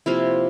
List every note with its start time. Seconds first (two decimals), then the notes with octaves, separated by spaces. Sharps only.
0.06 C3 F3 A#3 E4